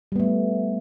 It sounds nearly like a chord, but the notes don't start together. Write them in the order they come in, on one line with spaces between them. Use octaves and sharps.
G3 B3 A3